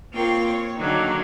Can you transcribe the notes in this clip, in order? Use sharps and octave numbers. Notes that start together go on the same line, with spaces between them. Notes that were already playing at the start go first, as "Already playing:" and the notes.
A#3 C4 F4 A#4 C#5 G5
C#5
D3 D#3 F#3 A#3